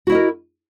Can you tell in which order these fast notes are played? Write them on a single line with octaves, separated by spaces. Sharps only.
F#4 E4 D#5 A#4